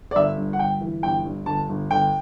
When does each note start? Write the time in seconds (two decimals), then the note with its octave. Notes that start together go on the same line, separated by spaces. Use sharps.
0.11 D5
0.15 G1 E5
0.38 G2
0.53 F#5
0.59 G1 G5
0.81 E3
1.03 G1 G5
1.25 G2
1.46 G1 A5
1.69 G1
1.91 G1 G5